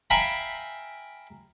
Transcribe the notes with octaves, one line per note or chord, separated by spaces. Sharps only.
E5 F5 G5 G#5 A#5 B5